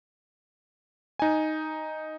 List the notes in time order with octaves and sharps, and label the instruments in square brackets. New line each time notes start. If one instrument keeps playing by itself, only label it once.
[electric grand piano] D#4 G#5